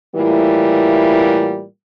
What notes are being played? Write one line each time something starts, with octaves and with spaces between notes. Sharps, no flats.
A2 E3 G3 A#3 E4 F4